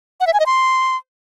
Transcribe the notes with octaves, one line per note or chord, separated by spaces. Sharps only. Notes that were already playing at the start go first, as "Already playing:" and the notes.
F#5
E5
G#5
D#5
C6